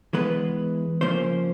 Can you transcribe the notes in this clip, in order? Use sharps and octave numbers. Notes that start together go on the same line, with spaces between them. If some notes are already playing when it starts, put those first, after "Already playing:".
E3 G#3 B3 B4
C#3 F3 A#3 C#4 C5